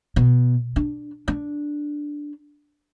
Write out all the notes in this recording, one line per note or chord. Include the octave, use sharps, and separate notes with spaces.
B2
D4
D4